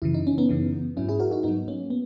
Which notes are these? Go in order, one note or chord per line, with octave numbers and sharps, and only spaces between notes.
F#2 C#3 E3 E4
D#4
C#4
B3 D#4
F#2 C#3 E3
G#2 F#3 C#4 E4
E4 G#4
F#4 A#4
D#4 F#4
G#2 F#3 B3 D#4
A#3 C#4
B3